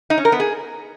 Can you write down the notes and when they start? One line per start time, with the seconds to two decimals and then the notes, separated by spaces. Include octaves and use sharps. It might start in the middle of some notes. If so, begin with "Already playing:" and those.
0.10 D#4
0.18 C#4
0.25 A#4
0.32 B3
0.40 G#4